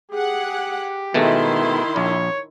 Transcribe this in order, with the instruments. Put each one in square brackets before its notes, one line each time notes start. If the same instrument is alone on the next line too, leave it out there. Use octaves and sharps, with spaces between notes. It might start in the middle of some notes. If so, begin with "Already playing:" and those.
[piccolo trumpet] G4 [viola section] G#4 F#5
[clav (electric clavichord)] B2 G#3 A3 [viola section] D#3 E4 C6
[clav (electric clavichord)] A#1 [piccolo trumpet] C#5